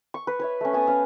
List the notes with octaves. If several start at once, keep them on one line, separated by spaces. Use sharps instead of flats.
C#6
B4
B4 C#5 E5
A3 C#4
B3 G#5 A5 D#6
C#4 F5